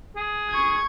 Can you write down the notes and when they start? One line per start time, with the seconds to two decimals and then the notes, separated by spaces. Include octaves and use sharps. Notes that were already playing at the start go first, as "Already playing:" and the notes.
0.16 G#4
0.51 C#6 G#6